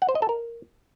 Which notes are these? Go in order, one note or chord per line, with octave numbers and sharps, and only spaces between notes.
F#5
C5
D#5
A4
A#4